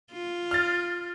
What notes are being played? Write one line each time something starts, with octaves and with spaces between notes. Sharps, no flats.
F4
F6 A6